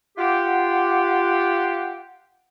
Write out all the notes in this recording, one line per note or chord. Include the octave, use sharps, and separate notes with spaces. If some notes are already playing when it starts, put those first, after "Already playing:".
F4 G4 F#5